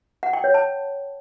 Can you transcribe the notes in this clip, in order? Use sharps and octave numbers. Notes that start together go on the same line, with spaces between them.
F#5
G5
C#5
A5